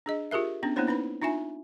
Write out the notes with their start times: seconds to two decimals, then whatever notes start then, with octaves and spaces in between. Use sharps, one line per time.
0.06 D4 G#4 D#5
0.31 F4 G4 G#4 A#4 E5
0.63 B3 C#4 D4
0.76 A#3 B3 D4 E4 C5 C#5
0.87 C#4 D#4 B4 B5
1.22 D4 D#4 F4 E5 G#5